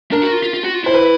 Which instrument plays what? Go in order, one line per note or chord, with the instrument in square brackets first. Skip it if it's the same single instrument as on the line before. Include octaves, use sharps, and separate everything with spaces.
[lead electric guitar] D4 [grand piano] A#4
[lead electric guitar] F#4
F4
F4
F4
F#4
F4
[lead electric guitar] E4 [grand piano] C5
[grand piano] B4